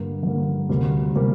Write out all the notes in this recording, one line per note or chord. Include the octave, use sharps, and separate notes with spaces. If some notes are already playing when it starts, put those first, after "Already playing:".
Already playing: G2 D3 A#3
G2 D3 A#3
D2 C3 G3 A#3
C3 G3 A#3